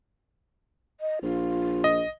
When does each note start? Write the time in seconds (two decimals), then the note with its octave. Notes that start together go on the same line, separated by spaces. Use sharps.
1.01 D#5
1.22 A#1 F4
1.84 D#5